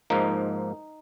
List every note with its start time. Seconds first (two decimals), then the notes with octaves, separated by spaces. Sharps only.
0.10 G#2 F3 A#3 D#4